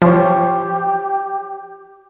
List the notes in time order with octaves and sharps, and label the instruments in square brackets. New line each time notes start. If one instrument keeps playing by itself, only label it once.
[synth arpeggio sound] F3 [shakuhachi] G4 [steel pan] C5 C#5